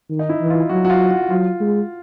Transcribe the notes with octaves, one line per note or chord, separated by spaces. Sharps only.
D#3
D#4
E4
E3
F4
F#3 F#4
F#4
F4
F#4
F#3 F4
G#3